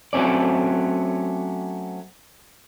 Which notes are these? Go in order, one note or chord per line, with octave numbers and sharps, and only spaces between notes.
F#3 A3 C4 C#4 D5